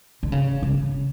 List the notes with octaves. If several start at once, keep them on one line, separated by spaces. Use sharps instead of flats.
D3
C#3
C#3